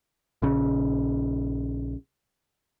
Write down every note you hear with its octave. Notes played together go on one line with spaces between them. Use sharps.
A#1 C#3